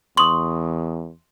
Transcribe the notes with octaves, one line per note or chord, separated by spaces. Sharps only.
E2 C6 C#6 D#6 F#7